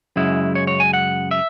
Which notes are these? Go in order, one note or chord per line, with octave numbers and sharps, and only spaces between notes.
F#2 C#3 G#3 E4
C#5
C#5
G#5
F#5
E5